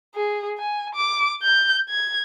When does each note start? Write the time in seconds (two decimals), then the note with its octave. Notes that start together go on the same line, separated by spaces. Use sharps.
0.15 G#4
0.58 G#5
0.95 D6
1.43 G6
1.89 G#6